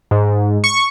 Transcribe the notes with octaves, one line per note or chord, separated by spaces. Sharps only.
G#2
C#6